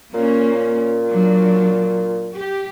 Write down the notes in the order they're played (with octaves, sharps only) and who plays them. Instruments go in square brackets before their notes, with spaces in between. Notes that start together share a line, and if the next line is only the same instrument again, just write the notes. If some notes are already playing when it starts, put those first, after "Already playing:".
[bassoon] A#2 [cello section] A#3 C#4
[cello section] F#3 D4
G4